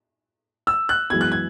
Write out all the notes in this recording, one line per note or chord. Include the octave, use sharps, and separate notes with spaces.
E6
F#6
F#2 E3 G#3 B3 G#6
F#6
G#6